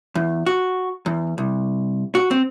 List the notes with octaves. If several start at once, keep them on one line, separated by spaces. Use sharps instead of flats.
E2
F#4
E2
C2
F#4
C4